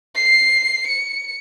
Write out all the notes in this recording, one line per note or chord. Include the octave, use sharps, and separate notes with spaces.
C7
C#7